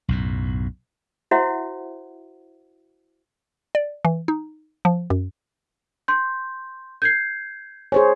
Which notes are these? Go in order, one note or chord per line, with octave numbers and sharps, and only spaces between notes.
B1 F#2 A2
E4 F#4 C5 E5 F#5
D5
E3
D#4
F3
F#2
C6 G6
G6 G#6 C7
G#4 C5 C#5 G#5